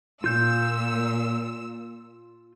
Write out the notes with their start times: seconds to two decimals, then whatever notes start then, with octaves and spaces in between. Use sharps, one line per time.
0.24 A#2 F4 E6 G6